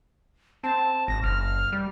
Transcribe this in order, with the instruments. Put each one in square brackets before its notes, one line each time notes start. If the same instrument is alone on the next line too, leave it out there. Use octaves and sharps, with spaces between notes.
[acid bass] C4 [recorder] A5
[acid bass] G#1 [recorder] A#6
[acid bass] F#1 [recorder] F6
[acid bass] G3